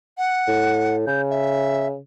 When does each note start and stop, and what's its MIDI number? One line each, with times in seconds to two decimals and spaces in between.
0.18 0.96 78
0.47 1.03 45
1.07 1.98 49
1.07 1.22 91
1.30 1.88 76